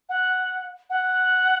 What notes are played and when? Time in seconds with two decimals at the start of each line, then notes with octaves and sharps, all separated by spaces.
0.09 F#5
0.90 F#5